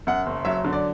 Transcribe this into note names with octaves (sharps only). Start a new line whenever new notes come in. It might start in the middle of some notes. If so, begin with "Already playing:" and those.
F#2 F#5
F#1
F#3 E5
D3
D5